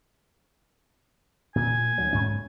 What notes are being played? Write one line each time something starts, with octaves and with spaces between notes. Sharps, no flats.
A#2 G#5
D2 F#3
G#2 C#4